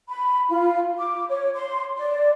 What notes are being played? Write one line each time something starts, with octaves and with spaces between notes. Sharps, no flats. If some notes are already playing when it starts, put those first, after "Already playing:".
B5
F4
D6
C#5
C6
D5